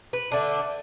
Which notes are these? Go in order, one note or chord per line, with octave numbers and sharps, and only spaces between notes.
B4
D3 A3 D4